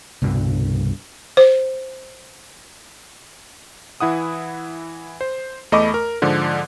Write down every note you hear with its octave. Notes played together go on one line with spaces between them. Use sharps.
C2 G2 B2 D3
C5
E3 E4 F#5 D#6
C5
E2 A3 D#5 B5 C#6 D6
A#4
G#2 D3 F3